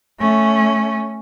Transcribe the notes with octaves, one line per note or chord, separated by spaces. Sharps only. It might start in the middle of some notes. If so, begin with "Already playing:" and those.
A3 C#4